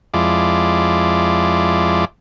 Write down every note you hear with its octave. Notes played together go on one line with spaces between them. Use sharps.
F2 G#3 E4 F4 D5 D6